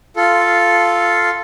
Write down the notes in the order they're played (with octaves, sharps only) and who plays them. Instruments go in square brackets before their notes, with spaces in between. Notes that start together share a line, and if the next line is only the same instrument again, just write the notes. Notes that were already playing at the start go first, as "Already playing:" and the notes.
[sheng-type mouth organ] F4 A4